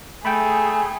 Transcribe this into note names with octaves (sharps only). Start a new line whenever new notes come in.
A3 G#4 G5 B5